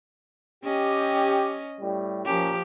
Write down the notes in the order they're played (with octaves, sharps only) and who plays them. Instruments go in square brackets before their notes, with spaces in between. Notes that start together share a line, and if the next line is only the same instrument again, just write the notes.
[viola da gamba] C#4 D#5 [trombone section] G4
[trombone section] A2 G3
[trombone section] A#2 C#4 A#4 [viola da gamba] F3 G4